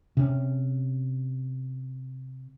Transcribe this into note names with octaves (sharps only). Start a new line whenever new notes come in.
C3 C#4